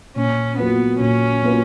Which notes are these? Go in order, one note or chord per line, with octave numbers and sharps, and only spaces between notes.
A#2 C#4
F#3 A#3 B3 F4 B4
A#2 C#4
F#3 A#3 F4 B4